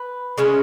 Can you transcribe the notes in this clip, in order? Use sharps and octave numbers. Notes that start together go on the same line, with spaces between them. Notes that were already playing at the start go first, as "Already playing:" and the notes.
Already playing: B4
C#3 G#3 C#4 E4